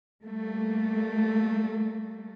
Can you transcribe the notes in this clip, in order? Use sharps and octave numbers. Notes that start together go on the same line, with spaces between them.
G3 A3 A#3